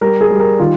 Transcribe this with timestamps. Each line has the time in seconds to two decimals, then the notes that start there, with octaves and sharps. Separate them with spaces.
0.01 G3 A#4
0.21 G#4
0.31 G3
0.40 A#4
0.59 D#3 F4